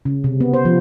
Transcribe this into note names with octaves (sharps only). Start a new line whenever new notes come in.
C#3
C3
B3
C5
F3